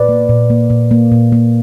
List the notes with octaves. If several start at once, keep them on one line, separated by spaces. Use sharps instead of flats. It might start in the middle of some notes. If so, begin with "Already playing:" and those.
Already playing: A#2 B4 D5
A#3
A#2
A#3
A#2
A#3
A#2
A#3